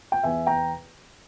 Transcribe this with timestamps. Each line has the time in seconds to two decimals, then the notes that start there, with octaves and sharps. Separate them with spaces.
0.12 G5
0.23 E2 E5 G#5
0.47 G5 A#5